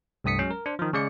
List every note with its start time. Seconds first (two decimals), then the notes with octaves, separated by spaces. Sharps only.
0.24 C2 G2 A3 D#6 B6 C#7
0.39 F#3 G#3 C#4
0.51 A#4
0.66 D4 C5
0.79 D#3 F3
0.93 C#3 G#3 D5 C#7